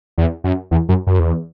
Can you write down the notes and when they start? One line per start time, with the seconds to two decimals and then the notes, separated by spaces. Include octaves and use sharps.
0.18 E2
0.44 F#2
0.71 E2
0.89 F#2
1.07 F#2
1.19 E2